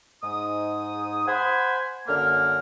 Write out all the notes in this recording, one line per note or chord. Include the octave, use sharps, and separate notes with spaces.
G#2 D#6
C5 F#5 G#5 B5
F#2 D3 A#3 F6